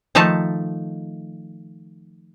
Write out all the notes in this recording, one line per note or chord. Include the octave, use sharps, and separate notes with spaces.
D#3 F3 A3 D#4 A5